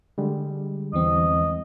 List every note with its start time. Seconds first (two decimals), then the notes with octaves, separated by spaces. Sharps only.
0.18 D3 G3 G#3
0.93 E2 E3 C4 D#5